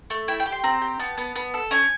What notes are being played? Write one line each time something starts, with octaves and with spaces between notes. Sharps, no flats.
A3
E4 G5
G5
G4
C6
C4 A#5
G4
B3 A5
B3
B3
A4
C#4 G#5